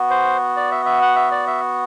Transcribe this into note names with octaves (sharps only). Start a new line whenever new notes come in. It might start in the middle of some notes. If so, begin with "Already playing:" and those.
Already playing: B3 F#4
C5
D5
E5
E5
F#5
E5
D5
E5